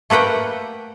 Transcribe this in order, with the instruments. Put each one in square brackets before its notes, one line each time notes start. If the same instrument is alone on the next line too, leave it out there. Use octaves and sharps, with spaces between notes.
[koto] A3 A#3 B4 F#5 G5